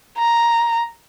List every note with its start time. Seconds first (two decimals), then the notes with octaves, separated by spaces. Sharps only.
0.18 A#5